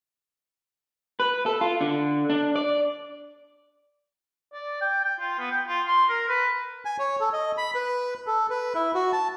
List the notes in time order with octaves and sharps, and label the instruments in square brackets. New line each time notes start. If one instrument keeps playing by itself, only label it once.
[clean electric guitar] B4
A4
F4
D3
D4
D5
[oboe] D5
G5
G5
F4
B3
G5
F4
C6
A#4
B4
[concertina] G#5
C#5
A4
D#5
B5
B4
A4
B4
E4
F#4
A5